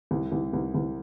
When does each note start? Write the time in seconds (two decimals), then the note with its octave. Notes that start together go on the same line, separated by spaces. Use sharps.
0.11 C2
0.32 C2
0.53 C2
0.74 C2